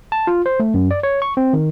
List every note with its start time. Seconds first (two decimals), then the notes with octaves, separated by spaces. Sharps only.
0.12 A5
0.27 F4
0.46 C5
0.60 A3
0.74 F#2
0.91 D5
1.03 C#5
1.22 C#6
1.37 C4
1.53 D#3